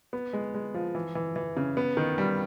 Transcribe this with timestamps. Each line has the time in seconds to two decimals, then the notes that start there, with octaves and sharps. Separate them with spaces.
0.13 B3
0.33 G#3
0.54 G#3
0.74 F3
0.95 E3
1.15 E3
1.36 E3
1.57 C#3
1.77 B3
1.97 D#3
2.18 G3